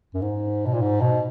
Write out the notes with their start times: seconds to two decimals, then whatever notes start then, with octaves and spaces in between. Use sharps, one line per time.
0.14 F#2
0.22 G#2
0.66 B2
0.74 A#2
0.82 G#2
1.01 B2